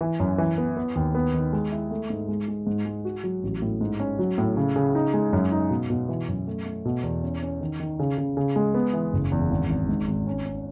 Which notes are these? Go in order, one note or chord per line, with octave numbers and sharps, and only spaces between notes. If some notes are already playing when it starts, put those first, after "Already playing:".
E3
F#2
E3
B3
B3
D#2
B3
D#3
G#3
E4
A3
G#2
G#3
G#3
G#2
G#3
F#4
F#3
A1
A2
G#2
C#4
F#3
A2
C#3
C#3
D#4
G#3
F#2
D#4
B2
B2
E3
F#2
A3
A3
B2
E2
C#4
C#4
D#3
D#3
C#3
C#3
C#3
G#3
B3
E3
F#1
E2
G#1
G#1
G#2
G#1
C#4
C#4